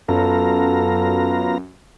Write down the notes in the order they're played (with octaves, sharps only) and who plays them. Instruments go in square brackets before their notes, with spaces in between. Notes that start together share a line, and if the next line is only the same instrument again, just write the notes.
[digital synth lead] F#2 [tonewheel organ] B3 F4 A#5 [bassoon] A4